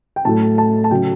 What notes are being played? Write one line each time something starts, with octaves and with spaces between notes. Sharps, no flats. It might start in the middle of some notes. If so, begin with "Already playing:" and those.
G5
A2 F#3 A3 A5
A5
A5
C#3 F#3 A3 G5